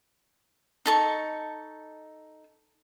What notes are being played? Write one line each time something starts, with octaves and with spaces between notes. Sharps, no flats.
D#4 A4 C#6